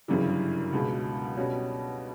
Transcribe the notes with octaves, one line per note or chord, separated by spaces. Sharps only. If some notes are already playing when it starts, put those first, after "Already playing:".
G1 F#2 C#3 E3 G3
C#2 B2 F#3
B2 G3 C#4 F#4